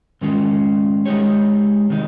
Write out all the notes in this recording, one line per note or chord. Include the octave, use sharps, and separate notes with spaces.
G#2 D#3 G#3 C#4 F4
G#3 D#4 G4 C#5
C3 D#3 G#3 D#4